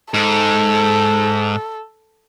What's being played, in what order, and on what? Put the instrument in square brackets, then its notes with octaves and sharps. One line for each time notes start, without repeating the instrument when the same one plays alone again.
[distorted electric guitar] G#2 [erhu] A4